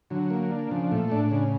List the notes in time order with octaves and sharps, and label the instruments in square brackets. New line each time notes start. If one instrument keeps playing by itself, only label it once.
[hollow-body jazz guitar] D3 [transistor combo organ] F#3
[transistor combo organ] A#3
D4
[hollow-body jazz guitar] C#3 [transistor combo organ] F3
[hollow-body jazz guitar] A#2 [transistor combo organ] A3
[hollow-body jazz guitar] A2 [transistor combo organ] D4
[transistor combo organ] C#3